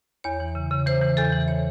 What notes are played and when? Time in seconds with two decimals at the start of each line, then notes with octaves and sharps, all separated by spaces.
0.24 E2 C#5
0.40 E3
0.55 C#3
0.71 C#3
0.86 E3 C5
1.01 E3
1.17 E2 A4
1.32 E3
1.48 C#5